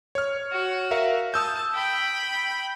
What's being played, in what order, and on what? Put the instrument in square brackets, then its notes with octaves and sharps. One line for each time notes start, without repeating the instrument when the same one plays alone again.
[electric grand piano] C#5 F6
[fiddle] F#4
[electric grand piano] A#4 E5 F5
[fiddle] A5 [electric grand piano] D#6 E6 G6
[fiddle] G5 B5